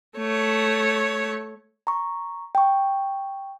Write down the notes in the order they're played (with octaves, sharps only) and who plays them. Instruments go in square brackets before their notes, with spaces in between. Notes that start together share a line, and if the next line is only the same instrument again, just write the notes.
[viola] A3 C#5
[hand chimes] A#5 C#6
G5 C#6